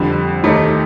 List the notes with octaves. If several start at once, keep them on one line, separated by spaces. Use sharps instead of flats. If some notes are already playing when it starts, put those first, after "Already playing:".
Already playing: F2 D3 G3
D#2 D#3 A3 D#4 G4